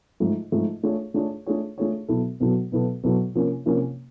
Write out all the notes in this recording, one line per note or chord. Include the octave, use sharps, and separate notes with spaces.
G#2 F3 A3
G#2 F3 A3
A3 D4 F4 G#4 C#5
A3 D4 F4 G#4 C#5
A3 D4 F4 G#4 C#5
A3 D4 F4 G#4 C#5
B2 F#3 B3 E4 A4
B2 F#3 B3 E4 A4
B2 F#3 B3 E4 A4
B2 F#3 B3 E4 A4
C3 F3 A#3 C#4
C3 F3 A#3 C#4